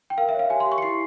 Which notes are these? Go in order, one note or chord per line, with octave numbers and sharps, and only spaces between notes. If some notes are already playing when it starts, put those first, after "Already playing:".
G5
A#4 F5
E5
C#5
F5
G4 G#5
C6
G4
C#6
C#7
E4 C7